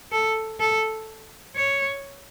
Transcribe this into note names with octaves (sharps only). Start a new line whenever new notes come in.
A4
A4
C#5